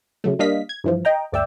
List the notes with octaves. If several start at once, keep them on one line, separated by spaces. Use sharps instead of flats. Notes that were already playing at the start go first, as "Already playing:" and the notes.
C#3 F#3 A3
G3 A#3 D4 D#5 F5 B6
G#6
G2 E3 F3
D#5 G5 A#5
G1 D2 D5 E5 G5 E6